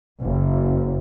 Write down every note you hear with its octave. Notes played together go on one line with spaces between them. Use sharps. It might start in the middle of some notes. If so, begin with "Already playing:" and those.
F#1